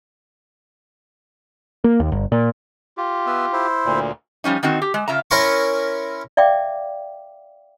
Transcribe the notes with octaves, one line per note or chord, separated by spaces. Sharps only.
A#3
D#2
G1
A#2
F4 G4
B3 E5
E4 C5
D2 A#2
F3 G3 C#4 D#4
D#3 C4 D#4 F#4
G4
G#3
C#3 F4 E5 A#5
C#4 E4 A#4 G#5 C6 C#6
D5 E5 F5 G5 D6